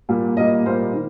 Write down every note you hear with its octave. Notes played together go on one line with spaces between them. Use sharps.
A#2 G3 A#3
A#2 G3 A#3 D#5
A#2 G3 A#3 C5
D#3